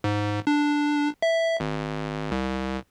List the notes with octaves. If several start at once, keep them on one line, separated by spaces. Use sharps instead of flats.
G#2
D4
E5
G#1
C2